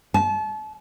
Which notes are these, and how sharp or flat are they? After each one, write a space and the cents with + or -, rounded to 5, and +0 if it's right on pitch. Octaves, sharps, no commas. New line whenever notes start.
A5 -35